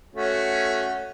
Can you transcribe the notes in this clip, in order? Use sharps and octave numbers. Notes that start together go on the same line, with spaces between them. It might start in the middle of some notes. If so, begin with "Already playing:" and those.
A3 C#4 F#4